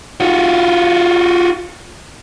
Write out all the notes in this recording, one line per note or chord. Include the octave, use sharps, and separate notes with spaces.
F4 F#4